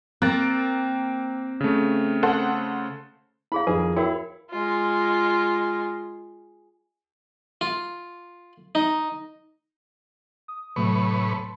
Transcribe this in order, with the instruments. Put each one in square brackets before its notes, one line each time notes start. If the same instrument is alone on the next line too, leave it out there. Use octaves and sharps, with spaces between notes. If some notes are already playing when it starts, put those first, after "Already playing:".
[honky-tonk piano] A#3 A6 [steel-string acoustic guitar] C4 [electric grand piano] F#6
[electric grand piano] C#3 A3
[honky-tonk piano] A4 C5 F#5
[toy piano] E4 G#4 F5 [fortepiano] B5
[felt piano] F2 D#3 A#4 [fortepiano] G#4 [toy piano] B4
[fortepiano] E4 [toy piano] F#4 A#4 G5 [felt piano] C#5
[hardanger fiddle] G#3 F4
[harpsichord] F4
D#4
[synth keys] D#6
[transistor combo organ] A2 B4 C#6 [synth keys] C3 F#3 A3
[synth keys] A5 B5 C6